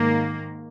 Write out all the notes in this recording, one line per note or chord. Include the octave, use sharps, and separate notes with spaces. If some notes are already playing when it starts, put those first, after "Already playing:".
Already playing: G#2 D#3 A#3